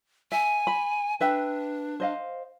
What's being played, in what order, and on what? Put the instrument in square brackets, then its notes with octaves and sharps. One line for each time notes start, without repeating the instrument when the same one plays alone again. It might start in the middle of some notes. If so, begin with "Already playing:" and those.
[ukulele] E5 [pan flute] G#5
[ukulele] B5
[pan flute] D4 [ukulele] B4 E5 G5
[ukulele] C5 D#5 F5